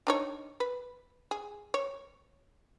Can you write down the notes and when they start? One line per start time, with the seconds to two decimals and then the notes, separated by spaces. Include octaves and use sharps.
0.07 D4 D#4 C#5
0.60 B4
1.31 G#4
1.74 C#5